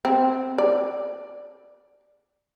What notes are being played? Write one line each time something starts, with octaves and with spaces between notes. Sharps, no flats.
C4
D5